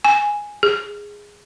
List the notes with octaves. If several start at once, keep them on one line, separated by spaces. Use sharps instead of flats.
G#5
G#4